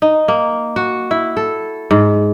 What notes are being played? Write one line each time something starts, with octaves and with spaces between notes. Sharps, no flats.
D#4
A#3
F#4
E4
A4
G#2